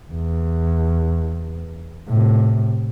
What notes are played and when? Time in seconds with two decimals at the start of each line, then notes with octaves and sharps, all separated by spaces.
0.13 E2
2.09 A2 C3